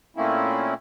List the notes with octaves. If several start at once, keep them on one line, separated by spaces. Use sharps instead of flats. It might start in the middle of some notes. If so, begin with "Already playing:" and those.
A#2 A3 A#3 C4 C#4 E4